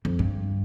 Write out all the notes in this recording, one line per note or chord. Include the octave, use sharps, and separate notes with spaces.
F2
G2